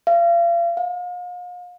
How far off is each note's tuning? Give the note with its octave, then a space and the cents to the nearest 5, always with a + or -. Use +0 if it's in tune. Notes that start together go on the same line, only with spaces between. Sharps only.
F5 -35
F5 +40